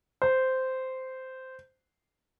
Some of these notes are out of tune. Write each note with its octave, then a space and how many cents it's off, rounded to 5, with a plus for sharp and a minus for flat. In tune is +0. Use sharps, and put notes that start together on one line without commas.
C5 -10